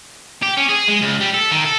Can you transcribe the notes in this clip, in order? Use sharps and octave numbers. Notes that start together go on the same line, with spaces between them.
G4
C#4
G#4
G#3
C#2
G3
A4
D#3
A4